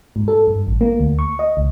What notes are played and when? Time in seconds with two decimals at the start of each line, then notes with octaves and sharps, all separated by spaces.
0.16 G#2
0.28 A4
0.47 G2
0.67 A1
0.81 A#3
1.00 D2
1.19 C#6
1.39 D#5
1.57 C#2